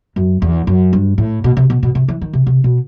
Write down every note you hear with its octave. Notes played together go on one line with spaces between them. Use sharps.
F#2
E2
F#2
G2
A2
B2
C3
B2
B2
C3
E3
D#3
C3
C3
B2